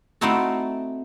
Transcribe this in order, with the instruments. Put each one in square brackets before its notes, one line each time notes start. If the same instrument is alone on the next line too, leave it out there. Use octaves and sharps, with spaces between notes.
[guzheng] A3 C4 D#4 E4 F#4 A4